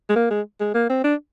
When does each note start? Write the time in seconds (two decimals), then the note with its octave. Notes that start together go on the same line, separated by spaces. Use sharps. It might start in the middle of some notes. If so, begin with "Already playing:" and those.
0.09 G#3
0.16 A#3
0.30 G#3
0.60 G#3
0.74 A#3
0.89 C4
1.04 D4